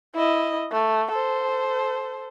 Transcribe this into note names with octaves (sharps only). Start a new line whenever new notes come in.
E4 D#5
A3
A4 C5